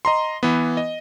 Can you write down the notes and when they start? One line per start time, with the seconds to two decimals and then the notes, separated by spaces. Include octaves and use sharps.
0.05 D#5 A#5 C6
0.43 E3 B3
0.77 D#5